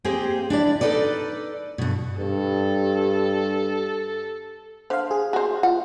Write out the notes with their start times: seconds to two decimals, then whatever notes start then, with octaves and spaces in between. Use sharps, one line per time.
0.05 A#3 C4 G4 G#4 C5
0.50 D4 E4 D5
0.81 D#4 A4 B4 D5
1.78 G2 B2
2.19 G2 A4
4.90 D3 C5 F5
5.11 G#4
5.33 F#4 C5
5.63 F4 F#5